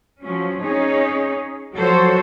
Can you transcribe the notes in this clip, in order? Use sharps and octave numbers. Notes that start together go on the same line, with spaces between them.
F3 F#3 C#4
C#4 D#4 G#4 C#5
F3 F#3 F#4 A4 C5 C#5